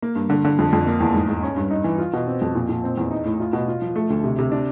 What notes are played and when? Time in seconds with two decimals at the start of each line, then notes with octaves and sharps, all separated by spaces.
0.02 A#3
0.16 G2
0.30 D3
0.45 D3
0.59 F2
0.73 F2
0.87 A#3
1.01 E2
1.14 G#2
1.28 G#2
1.43 C#4
1.56 G2
1.71 D#4
1.84 E3
1.98 F4
2.13 B2
2.27 C4
2.42 F2
2.55 A#2
2.69 A#2
2.84 C4
2.98 E2
3.11 D#4
3.25 A2
3.40 F4
3.53 B2
3.68 F4
3.82 F3
3.96 A3
4.10 D2
4.24 C3
4.39 C3
4.52 D4